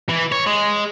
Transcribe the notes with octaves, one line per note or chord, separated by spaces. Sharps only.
E3
C#5
G#3